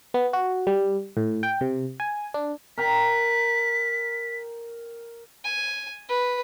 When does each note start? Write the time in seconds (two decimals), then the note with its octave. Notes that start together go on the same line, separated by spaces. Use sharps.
0.14 B3
0.33 F#4
0.67 G3
1.17 A2
1.43 G5
1.61 C3
2.00 G#5
2.34 D4
2.78 A#4 G5 A#5 B6
5.44 G#5
6.09 B4